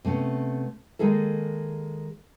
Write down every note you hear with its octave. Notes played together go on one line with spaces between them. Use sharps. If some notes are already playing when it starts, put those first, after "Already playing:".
C3 A3 B3 C#4
D#3 G#3 A#3 G#4 A4